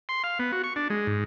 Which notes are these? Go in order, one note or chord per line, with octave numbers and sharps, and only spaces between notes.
C6
F5
B3
F#4
C#6
D4
G#3
G#2